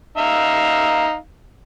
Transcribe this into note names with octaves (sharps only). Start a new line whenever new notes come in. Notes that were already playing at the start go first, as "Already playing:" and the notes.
D#4 E5 F5